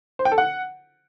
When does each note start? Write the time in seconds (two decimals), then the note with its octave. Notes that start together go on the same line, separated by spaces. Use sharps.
0.19 C5
0.25 G5
0.32 A4
0.38 F#5